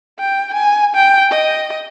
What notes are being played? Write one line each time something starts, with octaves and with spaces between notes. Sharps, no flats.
G5
G#5
G5
D#5